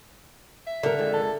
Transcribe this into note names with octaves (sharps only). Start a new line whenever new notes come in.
E5
D3 G3 A#4
F2 D#3 G#3
A4